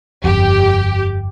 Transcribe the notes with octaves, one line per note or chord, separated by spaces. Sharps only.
G1 F2 G4